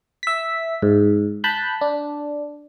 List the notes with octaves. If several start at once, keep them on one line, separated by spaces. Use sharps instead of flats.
E5 B6
G#2
A5 B5 F#6 G6
D4